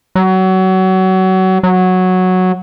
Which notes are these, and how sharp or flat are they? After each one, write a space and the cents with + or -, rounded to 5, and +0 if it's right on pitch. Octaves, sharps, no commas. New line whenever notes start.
F#3 +25
F#3 -5